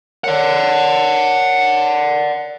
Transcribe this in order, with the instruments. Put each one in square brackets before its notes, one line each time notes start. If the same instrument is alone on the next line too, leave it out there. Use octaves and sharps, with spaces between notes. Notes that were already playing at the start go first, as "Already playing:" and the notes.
[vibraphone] A#4 C#5 [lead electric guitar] D5 F#5